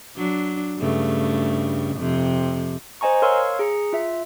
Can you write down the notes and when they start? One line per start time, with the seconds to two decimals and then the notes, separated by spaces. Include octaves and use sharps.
0.17 F#3 D4
0.79 G2 C#3 A3
1.96 F2 C3
3.01 C5 D#5 G#5 A#5 C#6
3.22 A#4 C#5 F5 C6 C#6 E6
3.59 G#4 A#5 C#7
3.93 F4 E5